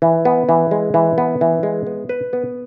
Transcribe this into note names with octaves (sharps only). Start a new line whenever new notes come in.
E3
B3
E3
G#3
E3
B3
E3
G#3
B3
B4
B3